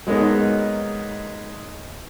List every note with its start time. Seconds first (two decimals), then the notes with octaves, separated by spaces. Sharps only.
0.07 F#3 G#3 A#3 B3 D#4